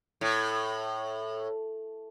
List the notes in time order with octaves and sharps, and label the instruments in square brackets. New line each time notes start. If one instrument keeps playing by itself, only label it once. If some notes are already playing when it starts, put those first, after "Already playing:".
[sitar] A2